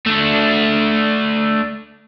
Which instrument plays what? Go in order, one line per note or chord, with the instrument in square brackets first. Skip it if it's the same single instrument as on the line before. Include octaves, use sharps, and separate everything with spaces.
[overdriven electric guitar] A3 D4